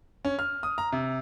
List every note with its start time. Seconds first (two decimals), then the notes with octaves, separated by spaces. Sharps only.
0.25 C#4
0.39 F6
0.63 D#6
0.78 A#5
0.92 C3